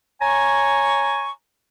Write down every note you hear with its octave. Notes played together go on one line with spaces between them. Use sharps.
C#5 G#5 A#5 C#6